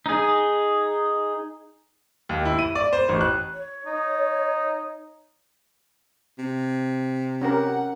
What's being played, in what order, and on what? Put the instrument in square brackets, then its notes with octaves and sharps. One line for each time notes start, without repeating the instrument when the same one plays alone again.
[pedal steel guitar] D#4 G#4
[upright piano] D#2
E4
D#7
D5
C5
A1
F#6
[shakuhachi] C#5
[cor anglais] D#4
[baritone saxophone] C3
[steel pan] C#4 G4 A#4 [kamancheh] F#5